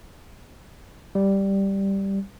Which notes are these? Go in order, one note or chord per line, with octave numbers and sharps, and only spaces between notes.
G3